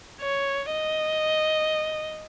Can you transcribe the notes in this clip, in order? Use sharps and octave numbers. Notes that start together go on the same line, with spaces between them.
C#5
D#5